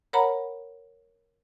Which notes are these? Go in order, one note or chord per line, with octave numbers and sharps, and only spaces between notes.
A#4 C#5 F#5 A#5 B5